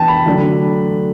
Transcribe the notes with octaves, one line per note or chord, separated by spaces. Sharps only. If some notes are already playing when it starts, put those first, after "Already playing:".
Already playing: E3 B3 D4 G5 A5
B5
D3 F#3 A3 D4